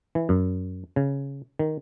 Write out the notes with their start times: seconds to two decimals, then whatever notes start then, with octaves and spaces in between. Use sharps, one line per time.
0.15 E3
0.29 F#2
0.96 C#3
1.59 D#3